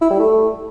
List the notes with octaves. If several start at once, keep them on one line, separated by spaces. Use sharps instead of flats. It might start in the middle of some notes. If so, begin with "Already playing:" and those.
E4
G3
A3